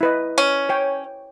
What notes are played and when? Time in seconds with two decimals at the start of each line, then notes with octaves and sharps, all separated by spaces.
0.01 E4 B4 D#5
0.38 C#4
0.69 C#5 G5